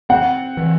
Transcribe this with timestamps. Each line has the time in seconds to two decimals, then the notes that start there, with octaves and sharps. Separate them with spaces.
0.10 C4 F#5
0.57 E3